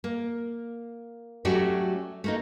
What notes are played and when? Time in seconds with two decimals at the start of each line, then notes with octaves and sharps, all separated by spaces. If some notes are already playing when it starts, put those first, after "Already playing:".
0.04 A#3
1.45 F#3 A3 C#4 F#4 G4 D5
2.24 A3 A#3 D#4